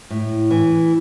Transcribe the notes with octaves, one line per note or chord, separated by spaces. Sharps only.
A2
E3